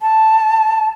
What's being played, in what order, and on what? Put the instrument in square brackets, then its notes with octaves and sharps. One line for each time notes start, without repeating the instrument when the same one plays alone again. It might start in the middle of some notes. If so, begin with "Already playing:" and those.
[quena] A5